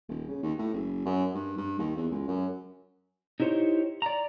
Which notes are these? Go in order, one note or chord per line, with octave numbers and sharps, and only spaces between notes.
D#1
C#3
D#2
A2
F#1
F#2
G2
G2
D#2
E2
C#2
F#2
D#4 E4 G4 C5 C#5
D5 A#5